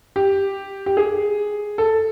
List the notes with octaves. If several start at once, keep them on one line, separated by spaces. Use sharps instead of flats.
G4
G4
G#4
A4